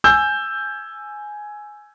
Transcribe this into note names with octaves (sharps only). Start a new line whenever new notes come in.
G#5 E6 G6